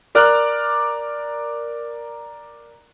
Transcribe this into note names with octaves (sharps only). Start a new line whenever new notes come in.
A#4 D5 A#5 D6 F6 F#6